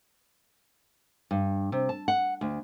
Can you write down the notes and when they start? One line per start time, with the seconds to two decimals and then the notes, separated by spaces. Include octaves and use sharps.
1.31 G2
1.72 C3
1.89 A5
2.08 F#5
2.41 D2